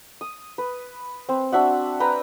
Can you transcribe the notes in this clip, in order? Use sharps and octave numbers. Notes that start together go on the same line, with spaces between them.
D#6
B4
C4
D4 F#4 E5 F#5
B4 G5 A#5